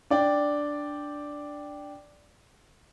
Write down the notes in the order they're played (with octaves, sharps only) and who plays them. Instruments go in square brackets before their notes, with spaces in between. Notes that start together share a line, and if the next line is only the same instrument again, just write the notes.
[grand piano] D4 D5 G5